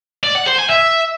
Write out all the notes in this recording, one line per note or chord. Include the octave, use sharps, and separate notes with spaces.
D5
F#5
C5
G#5
E5